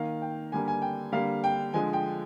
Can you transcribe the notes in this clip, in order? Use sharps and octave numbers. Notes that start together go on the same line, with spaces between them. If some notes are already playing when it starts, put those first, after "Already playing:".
Already playing: D#3 A#3 F5
G5
D3 G3 A#3 G#5
G#5
G5
D3 G3 A#3 F5
G5
D3 F3 G#3 G#5
G5